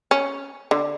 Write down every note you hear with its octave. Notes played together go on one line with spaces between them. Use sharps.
C#4
D3